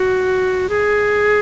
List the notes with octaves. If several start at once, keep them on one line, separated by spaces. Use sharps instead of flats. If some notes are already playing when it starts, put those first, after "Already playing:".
Already playing: F#4
G#4